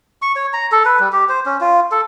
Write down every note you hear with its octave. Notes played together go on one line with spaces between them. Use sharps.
C#6
C#5
A#5
A4
B4
G3
G4
C5
C#4
F4
A4